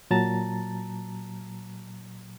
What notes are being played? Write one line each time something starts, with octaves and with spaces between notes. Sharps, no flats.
A#2 F#3 A5 A#5 A6